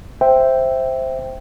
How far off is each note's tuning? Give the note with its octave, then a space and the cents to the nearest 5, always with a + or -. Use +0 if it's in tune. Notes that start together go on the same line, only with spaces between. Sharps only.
C5 +0 E5 +0 G5 +0